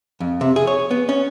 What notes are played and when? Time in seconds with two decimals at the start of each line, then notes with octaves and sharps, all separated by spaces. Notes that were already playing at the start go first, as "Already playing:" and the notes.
0.20 F2
0.41 C3
0.56 G#4
0.67 C#5
0.91 B3
1.09 C#4